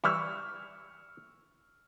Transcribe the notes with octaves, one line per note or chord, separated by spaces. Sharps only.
E3 G3 E4 C#6 E6 F6